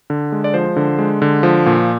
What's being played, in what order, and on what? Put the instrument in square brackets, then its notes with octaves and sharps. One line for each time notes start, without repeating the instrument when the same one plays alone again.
[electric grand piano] D3
G#3
D5
F3 C5
D3
G#3
D3
F3
A#2